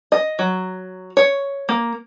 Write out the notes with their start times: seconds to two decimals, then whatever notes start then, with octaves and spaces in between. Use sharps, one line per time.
0.12 D#5
0.39 F#3
1.17 C#5
1.69 A#3